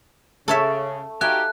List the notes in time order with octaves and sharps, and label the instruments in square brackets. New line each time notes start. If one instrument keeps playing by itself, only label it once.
[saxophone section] C#3 [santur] A3 [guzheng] A4 C#5 E5
[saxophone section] D#4 F#4 G4 [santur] E5 F5 [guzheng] G#5 [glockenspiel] F#6